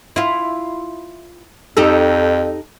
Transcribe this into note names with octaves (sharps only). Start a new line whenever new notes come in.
E4 F4
F2 D#4 G4 A4